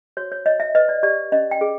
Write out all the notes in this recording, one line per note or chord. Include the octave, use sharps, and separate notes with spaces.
F#4 C#5
C#5
C#5 D#5
E5
B4 D#5
D5
G4 D5
C#4 D#5
G5
G#4